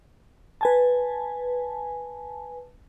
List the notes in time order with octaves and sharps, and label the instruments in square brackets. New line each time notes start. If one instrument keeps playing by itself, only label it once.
[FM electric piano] B4 G#5 A5